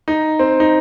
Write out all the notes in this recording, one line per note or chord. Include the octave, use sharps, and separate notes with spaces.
D#4
C4
D#4